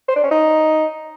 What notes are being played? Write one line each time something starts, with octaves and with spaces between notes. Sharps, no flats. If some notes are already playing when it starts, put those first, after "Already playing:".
C5
D4
C#4
D#4